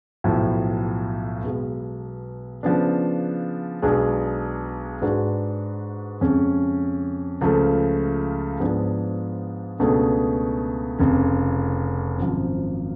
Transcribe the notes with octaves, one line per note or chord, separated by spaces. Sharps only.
B1 A2 F3
B1 B2 G#3 B3
C#3 F3 B3 D4
B1 B2 G#3 D4 G#4
G#2 G#3 D4 F#4 B4
F2 C#3 G#3 C#4
C#2 C#3 F3 A3
G#2 F3 B3 D4 G#4
C#2 B2 A3 D4 G#4
F1 F2 C#3
G#1 F#2 F3